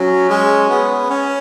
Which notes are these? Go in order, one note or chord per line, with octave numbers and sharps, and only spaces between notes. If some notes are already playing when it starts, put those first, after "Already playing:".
Already playing: F#3 C#4
G#3
B3
C#4